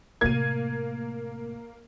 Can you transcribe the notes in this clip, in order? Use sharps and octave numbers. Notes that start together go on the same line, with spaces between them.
A2 C3 A#3 G#6 D#7